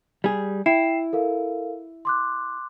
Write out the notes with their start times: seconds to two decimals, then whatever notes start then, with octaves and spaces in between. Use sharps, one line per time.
0.24 G3 G#4
0.66 E4 G5 C7 E7
1.13 A4 A#4 F5
2.05 C6 D6 F#6